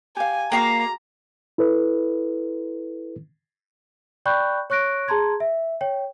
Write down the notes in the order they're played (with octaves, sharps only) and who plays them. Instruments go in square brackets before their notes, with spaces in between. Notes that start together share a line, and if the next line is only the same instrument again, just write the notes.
[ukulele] G4 F5 [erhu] G#5
[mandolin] A#3 F5 D6 [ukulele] F#4 G#4 G5 [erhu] A#5
[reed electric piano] E4 A4 B4
[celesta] D5 G5 B5 C#6 F#6 G6
C#5 C#6 F#6 A#6 D7
G#4 A5 A#5 C6 G#6
E5
C#5 G5